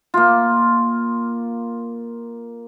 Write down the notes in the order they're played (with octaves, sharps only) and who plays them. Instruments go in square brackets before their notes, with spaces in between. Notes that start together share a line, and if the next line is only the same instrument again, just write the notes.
[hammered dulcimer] A#3 F4